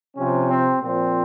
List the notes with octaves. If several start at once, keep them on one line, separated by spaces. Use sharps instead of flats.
C3 F3 C#4
C4
A#2 F3 C4